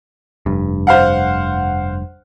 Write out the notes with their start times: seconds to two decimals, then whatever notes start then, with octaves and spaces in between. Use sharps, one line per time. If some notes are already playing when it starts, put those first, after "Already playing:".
0.46 F1 G2
0.87 C5 F5 F#5